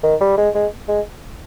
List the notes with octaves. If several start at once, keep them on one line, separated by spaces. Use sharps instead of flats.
D#3
G3
G#3
G#3
G#3